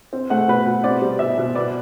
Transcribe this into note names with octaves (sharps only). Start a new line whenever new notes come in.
C4
A3 F#5
B2 B4
B2
C4 D5
G3
B2 E5
B2
B3 D5